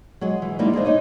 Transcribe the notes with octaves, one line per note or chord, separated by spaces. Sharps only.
F#3 G#3 G#4
E3
G3 G#3 A#3 D#4 E4
G#3 D4 G#4 C5
D#4 C#5 D#5